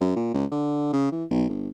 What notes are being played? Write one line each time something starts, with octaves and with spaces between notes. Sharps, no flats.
F#2
A#2
C#2
D3
C#3
E3
B1
G1